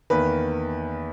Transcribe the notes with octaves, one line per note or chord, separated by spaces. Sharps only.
E2 D#3 A#3 B4